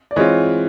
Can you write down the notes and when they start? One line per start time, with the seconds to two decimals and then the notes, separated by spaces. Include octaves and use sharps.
0.11 D5
0.16 E3 G#3 C4 F4 C#5 D#5